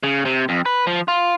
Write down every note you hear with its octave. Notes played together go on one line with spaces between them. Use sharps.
C#3
C3
F2
B4
F3
F4